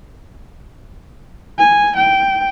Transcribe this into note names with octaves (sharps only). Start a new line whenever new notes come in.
G#5
G5